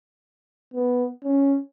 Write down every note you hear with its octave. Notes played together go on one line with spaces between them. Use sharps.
B3
C#4